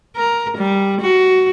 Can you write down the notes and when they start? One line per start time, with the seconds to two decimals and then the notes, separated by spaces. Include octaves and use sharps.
0.16 A#4
0.57 G3
1.01 F#4